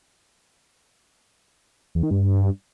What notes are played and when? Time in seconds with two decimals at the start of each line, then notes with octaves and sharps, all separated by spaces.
1.95 E2
2.03 D#3
2.11 G2